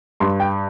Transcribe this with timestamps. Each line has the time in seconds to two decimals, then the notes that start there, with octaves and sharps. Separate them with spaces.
0.20 G2 C6
0.40 G5